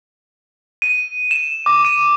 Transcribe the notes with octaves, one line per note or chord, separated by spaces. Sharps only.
D#7
E7
D6
D#7